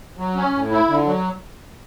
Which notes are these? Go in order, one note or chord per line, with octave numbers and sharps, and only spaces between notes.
F#3
C#4
A2
E4
D3
F#3